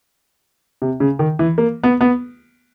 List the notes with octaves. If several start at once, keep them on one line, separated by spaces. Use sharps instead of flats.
C3
C#3
D#3
E3
A#3
B3
B3